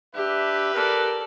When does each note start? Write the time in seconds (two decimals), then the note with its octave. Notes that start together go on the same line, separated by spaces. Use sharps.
0.15 D4 G4 B4 E5
0.75 A4 A#4 D5